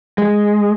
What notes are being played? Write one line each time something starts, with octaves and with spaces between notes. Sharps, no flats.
G#3